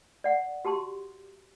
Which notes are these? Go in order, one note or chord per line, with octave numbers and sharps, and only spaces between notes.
D5 F#5
F#4 G4 A5 C6